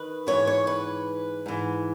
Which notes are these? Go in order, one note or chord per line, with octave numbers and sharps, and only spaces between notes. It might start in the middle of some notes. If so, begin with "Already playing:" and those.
Already playing: D#3 B4
G#2 E3 C#5
C#5
B4
G#2 E3